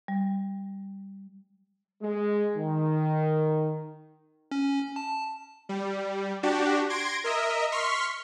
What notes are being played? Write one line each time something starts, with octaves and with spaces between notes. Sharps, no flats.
G3
G#3
D#3
C#4
A5
G3
D4 F#4 G4
C6 G#6 A#6 D7
A#4 D#5 E5
C6 C#6 F6 B6